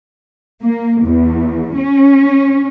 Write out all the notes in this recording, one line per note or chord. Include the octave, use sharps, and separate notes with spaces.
A#3
E2
C#4